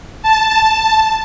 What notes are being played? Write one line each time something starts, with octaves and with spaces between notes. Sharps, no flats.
A5